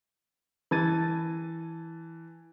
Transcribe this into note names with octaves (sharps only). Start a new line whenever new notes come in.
E3 A5 G#6 A6 D#7